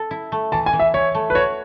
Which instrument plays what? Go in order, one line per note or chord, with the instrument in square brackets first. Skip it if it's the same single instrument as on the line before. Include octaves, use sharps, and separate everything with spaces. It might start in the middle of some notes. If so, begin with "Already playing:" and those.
Already playing: [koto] A4
E4
A3
[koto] E3 [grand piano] A5
[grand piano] G#5
[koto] E3
[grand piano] E5
[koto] E4 [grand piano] C#5
[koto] A3
[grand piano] B4
[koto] F#4 [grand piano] C#5